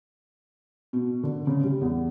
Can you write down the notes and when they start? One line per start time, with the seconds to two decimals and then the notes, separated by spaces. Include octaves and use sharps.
0.93 B2
1.23 D3
1.47 C#3
1.64 G3
1.81 E2